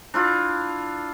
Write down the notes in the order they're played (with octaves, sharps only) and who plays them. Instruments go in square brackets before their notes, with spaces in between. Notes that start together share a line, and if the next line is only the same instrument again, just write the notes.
[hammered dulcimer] D4 E4 F4